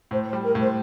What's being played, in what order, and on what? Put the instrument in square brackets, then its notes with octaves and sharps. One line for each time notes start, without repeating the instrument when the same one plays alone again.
[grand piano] A2 [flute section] C5
[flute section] C5
[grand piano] G3
[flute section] A#4
[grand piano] A2 [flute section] C5